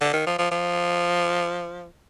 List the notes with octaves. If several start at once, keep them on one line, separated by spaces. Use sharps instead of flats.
D3
D#3
F3
F3
F3